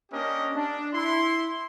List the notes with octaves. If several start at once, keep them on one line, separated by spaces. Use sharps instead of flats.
A#3 C#4 D4 G4 A#4 D#5
D4
E4 C6